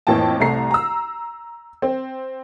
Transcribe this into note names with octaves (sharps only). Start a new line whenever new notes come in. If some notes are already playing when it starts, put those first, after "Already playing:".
F2 A2 E3 A#3 G5 A5
C2 C3 A3 A#5 C7
A#5 E6
C4